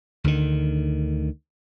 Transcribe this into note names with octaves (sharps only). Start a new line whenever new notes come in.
D2 D3 D#3